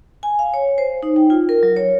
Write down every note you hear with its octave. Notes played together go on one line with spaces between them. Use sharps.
G#5
F5
C#5
C5
D#4
G5
F4
A#4
F#3
C#5